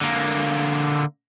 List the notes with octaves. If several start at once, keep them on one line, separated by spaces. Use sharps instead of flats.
D3 A#3